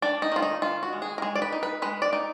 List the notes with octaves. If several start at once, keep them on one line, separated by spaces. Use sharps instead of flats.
D4 D5
D#4
D#3 F4
D#4
D#3 F4
F#4
G#3
G#4
A#4
G#3 G#4
D5
B4
D#4
B4
G#3 B4
D5
D#4